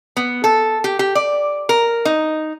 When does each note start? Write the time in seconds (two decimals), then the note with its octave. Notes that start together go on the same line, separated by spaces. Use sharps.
0.16 B3
0.44 A4
0.84 G4
0.99 G4
1.15 D5
1.69 A#4
2.05 D#4